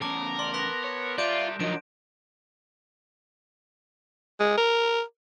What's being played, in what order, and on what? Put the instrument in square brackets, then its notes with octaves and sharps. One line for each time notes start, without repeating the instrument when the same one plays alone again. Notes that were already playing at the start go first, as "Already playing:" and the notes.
[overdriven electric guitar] E2 C#3 [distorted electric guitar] A#4 [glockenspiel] A5 D6
[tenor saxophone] D5 [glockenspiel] C6
[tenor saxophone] B3 [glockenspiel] C6 F#6 A#6
[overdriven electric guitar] C#5
[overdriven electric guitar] G3 E5 [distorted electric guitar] F4 [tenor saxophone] D5 [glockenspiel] G6 D7 E7
[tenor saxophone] D#3 [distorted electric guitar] F3 F#3 [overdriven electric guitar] D4 D#5 [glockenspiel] D7
[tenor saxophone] G#3
A#4